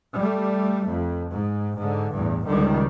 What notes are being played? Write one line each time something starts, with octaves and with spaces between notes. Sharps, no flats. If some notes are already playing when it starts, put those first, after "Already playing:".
G3 A3
F2
G#2
G#2 D3
A1 E2 G2
C#2 D#3 G3